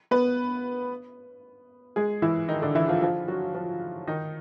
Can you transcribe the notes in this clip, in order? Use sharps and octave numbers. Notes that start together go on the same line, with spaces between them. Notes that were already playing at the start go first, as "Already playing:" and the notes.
B3 B4
G#3 G#4
E3 E4
D#3 D#4
D3 D4
E3 E4
F3 F4
F3 F4
F#3 F#4
F3 F4
D#3 D#4